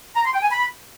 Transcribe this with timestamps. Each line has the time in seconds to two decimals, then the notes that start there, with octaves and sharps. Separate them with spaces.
0.16 A#5
0.25 C6
0.34 G5
0.42 G#5
0.51 B5